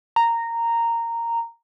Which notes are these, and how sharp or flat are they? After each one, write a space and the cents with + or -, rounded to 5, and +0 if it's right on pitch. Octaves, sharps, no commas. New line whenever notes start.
A#5 -10